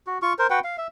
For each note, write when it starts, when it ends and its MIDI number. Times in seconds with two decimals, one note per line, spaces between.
0.07 0.18 66
0.22 0.33 65
0.22 0.33 85
0.39 0.47 70
0.39 0.47 72
0.50 0.60 66
0.50 0.60 71
0.50 0.60 78
0.50 0.60 79
0.64 0.76 77
0.78 0.87 76